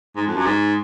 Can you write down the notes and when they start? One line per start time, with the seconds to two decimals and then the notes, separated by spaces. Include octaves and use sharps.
0.16 G#2
0.27 F2
0.36 F#2
0.46 G#2